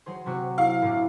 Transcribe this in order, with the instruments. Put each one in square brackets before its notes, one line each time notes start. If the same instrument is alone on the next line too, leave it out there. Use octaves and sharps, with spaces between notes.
[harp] F#3 G#4 C5
C3 F#3 F#4
[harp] E4 [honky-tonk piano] F5
[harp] A2 C3 D4